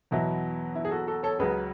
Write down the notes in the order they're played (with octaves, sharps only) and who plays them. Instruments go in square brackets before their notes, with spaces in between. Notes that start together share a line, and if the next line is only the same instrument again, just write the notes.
[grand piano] E2 B2 F#3 B3 E4
E4
G#4
F#4 A4
F#4 A4
A4 C#5
C#2 C#3 F#3 G#4 B4